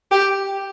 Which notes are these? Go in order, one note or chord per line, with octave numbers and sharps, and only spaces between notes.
G4